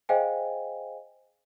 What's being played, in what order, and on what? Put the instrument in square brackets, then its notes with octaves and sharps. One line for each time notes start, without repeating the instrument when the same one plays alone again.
[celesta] G#4 C5 D#5 F5 G5 G#5